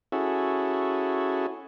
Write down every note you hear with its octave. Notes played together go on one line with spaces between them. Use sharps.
C#4 E4 F#4 G#4 A4